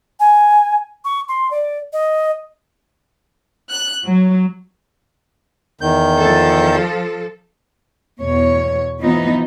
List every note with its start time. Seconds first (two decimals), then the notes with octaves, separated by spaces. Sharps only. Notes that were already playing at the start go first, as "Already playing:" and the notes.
0.20 G#5
1.05 C#6
1.29 C6
1.51 D5
1.93 D#5
3.70 F#6
4.04 F#3
5.81 E2 D#3 G6
6.19 F3 A4
8.21 E2 B2 C#5
9.00 E3 F3 B3 D#4